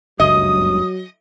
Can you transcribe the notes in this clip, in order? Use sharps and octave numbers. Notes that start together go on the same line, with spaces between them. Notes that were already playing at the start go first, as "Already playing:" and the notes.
F#1 C#2 G2 F#3 D#5 D#6